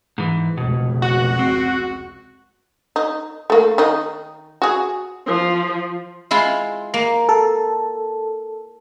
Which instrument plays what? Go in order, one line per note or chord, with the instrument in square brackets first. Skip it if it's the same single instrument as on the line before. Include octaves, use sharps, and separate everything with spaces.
[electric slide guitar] G#2 E3
[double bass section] F1 C#2 [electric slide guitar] B2
[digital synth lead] F#4
[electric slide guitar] C4
[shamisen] D#4
A3 A#3
D#3 D#4
F#4 G#4
[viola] F3
[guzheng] G#3 E4 F4
A#3
[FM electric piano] A4